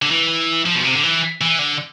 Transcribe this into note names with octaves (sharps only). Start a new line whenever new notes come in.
D3
E3
F3
B2
C3
D3
E3
E3
D3